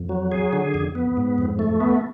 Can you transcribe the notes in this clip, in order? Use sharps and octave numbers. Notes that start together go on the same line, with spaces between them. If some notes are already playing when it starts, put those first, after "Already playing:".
Already playing: F2
F#3
G#4
D3
F2
B3
G#2
F2
A3
B3